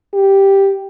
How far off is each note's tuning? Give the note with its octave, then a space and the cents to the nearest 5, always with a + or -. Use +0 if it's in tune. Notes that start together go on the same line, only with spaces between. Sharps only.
G4 +0